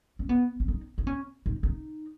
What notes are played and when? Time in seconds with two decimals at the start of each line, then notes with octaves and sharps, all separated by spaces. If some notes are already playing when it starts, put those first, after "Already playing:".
0.19 C#4
0.29 B3
0.60 C#4
0.68 D#4
0.98 D#4
1.07 C#4
1.46 D#4
1.63 D#4